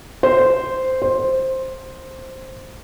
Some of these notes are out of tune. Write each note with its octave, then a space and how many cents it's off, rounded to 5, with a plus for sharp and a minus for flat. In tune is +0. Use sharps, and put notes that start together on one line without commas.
C5 -10
C5 +5